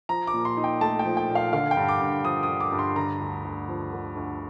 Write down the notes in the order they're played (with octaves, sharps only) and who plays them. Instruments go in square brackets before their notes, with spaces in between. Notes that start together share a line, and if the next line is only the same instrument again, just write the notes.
[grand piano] F3 A#5
D6
A#2
C6
D#4
G5
A3 A5
G5
F3
G5
A#2
F5
D3 F5
G5
G2
D6
G2
F3 D#6
D#6
D3
D6
G2
C6
D3 A#5
D2
D2
F3
D3
D2